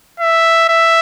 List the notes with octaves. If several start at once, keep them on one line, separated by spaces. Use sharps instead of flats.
E5
E5